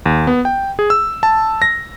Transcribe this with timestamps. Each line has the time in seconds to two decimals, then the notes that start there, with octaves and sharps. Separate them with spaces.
0.06 D#2
0.27 B3
0.45 G5
0.79 G#4
0.90 E6
1.23 A5
1.62 A#6